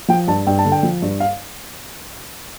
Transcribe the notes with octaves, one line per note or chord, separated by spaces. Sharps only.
F3 G5
G2 A5
G2 G5
A5
D3
G5
F3
G2
F5